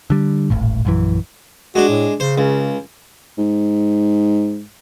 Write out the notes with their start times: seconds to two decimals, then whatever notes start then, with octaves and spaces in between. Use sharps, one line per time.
0.10 D3 G3
0.50 D#1 G#1 A2
0.85 A#1 F#2 E3
1.75 G#3 D4 F#4
1.89 A2
2.20 C#3 C5
2.38 C#2
3.37 G#2